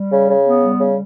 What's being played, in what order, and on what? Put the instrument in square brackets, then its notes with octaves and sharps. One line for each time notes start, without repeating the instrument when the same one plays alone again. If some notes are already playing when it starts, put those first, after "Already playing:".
Already playing: [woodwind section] G3
C#3
C#3
B3
G3
C#3